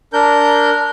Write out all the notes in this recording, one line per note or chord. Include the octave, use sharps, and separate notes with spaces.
D4 A#4 G6